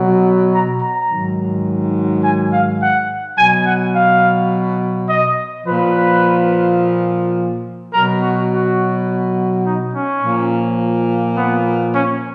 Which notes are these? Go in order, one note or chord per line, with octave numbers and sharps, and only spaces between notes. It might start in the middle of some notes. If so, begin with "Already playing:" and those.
Already playing: B2 F#3
A#5
A#5
G#2 D#3 F#3
G#5
F5
F#5
B2 F#3 G#5
F#5
F5
D#5
A#2 F3 B4
B2 F#3 A#4
F#4
F#4
D#4
C#4
A#2 F3
B3
C#4